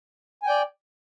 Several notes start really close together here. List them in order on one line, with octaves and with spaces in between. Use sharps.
G#5 G5 D5